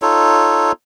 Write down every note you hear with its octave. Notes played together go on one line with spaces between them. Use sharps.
D#4 F4 A4 C#5